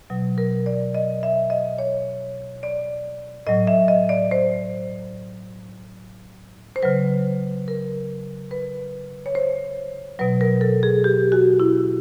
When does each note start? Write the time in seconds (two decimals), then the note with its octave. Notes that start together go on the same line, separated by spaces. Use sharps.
0.10 B2 F#3
0.38 A#4
0.66 D5
0.94 D#5
1.23 E5
1.50 D#5
1.78 C#5
2.63 D5
3.47 A2 F#3 D#5
3.67 E5
3.88 D#5
4.09 D5
4.31 C5
6.76 C5
6.83 C#3 F#3 B4
7.68 A#4
8.51 B4
9.26 C#5
9.35 C5
10.19 B2 F#3 B4
10.41 A#4
10.61 A4
10.83 G#4
11.04 G4
11.32 F#4
11.60 E4